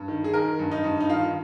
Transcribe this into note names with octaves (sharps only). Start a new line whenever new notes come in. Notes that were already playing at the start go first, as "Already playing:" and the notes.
Already playing: G2
D#3
G#4
D#3 A#4
G2
D#4
G2
D#4
D#3 F4